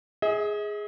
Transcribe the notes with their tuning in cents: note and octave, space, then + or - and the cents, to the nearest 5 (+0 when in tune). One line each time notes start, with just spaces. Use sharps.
G#4 +0 D#5 +45